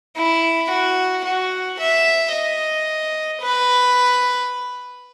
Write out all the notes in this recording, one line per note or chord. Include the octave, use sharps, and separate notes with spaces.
E4
F#4
F#4
E5
D#5
B4